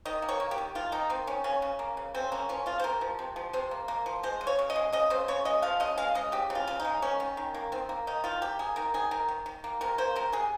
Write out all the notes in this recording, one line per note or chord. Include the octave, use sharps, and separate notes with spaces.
D#3 D#5
A#3
C#5
A#3
G4
D#3
D#3 F4
A#3 D#4
D#3 C4
D#3 C#4
C#3 C#4
C#3
A#3
C#3
C#3 C4
A#3 C#4
F3 C#4
C#3 F4
C5
C3 A#4
F3
C3
F3
C3 C5
A#3
A#3
F3
G#3 C5
C#3
C#5
C#3
D#5
G#3
C#3 D#5
C#3 C5
C#3 C#5
G#3 D#5
F3 F5
C#3 D#5
G#3 F5
C#3 D#5
C#3 G4
C#3
F4
C#3
D#4
G#3
A#3 C#4
D#3
D#3
A#3
D#3 C4
A#3
D#3 D#4
D#3 F4
A#3 G4
A#3 G#4
D#3 A#4
D#3 G#4
D#3 A#4
D#3
D#3
A#3
C3 A#4
A#3 C5
C3 A#4
C3 G#4